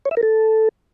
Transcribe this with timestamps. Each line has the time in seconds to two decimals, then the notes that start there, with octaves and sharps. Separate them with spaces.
0.05 C#5
0.11 E5
0.17 A#4
0.23 A4